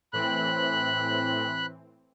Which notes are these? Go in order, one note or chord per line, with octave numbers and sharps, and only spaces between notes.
A2 E3 C4 B5 F#6